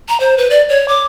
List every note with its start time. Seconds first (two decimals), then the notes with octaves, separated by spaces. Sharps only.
0.09 A#5
0.20 C5
0.37 B4
0.50 D5
0.69 C#5
0.88 D6